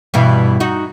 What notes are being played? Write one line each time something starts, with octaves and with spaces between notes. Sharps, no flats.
G2 B2 E3
D#4 F#4